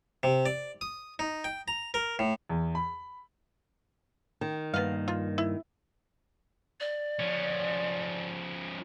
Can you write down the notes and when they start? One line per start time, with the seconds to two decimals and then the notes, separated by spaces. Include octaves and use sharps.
0.23 C3
0.46 D5
0.81 D#6
1.19 D#4
1.44 G5
1.68 A#5
1.94 A#4
2.19 A2
2.50 E2
2.75 B5
4.41 D#3
4.74 G2 A#3 B3 F5
5.08 F4
5.38 E4
6.80 D5
7.19 F3 C#4